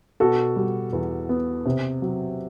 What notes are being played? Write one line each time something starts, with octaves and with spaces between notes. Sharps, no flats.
B2 F#4 A4
G3
E2
B3
C3
F#3